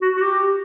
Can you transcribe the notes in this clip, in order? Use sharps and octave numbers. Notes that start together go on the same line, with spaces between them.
F#4
F#4
G4